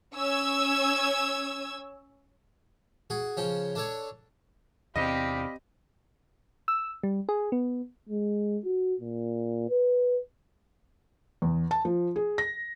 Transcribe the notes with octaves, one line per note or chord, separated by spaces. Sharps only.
C#4 E6 G#6
F#4 G#4
C#3 F3 C#4
D4 A4 C#5
E2 C3 C4 G4 D5 D#5 F5 B5
E6
G3
G#4
B3
G#3
F#4
A#2
B4
E2
A5
F3
G#4
A#6